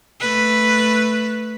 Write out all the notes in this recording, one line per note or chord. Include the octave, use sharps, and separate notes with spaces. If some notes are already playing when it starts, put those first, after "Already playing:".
A3 B4